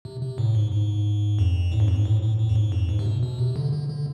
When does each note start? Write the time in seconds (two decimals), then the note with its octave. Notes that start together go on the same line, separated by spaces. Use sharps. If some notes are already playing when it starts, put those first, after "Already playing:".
0.05 C3
0.21 C3
0.38 A2
0.55 G#2
0.72 G#2
1.39 F2
1.72 A2
1.80 G#2
1.88 F2
1.96 G#2
2.05 A2
2.22 A2
2.39 A2
2.49 F2
2.55 G#2
2.72 F2
2.89 G#2
2.99 C3
3.06 B2
3.22 B2
3.39 C3
3.56 D3
3.72 D3
3.89 D3